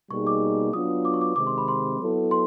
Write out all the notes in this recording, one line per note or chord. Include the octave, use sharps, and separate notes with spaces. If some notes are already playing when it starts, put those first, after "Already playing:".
B2 G3 A#3 D#4 G#4 C#6
D6
F#3 B3 D4 F4 D#6
D6
C#6
D6
C3 D#3 G#3 C4 D6
C6
B5
C6
F#3 B3 E4 A4
C6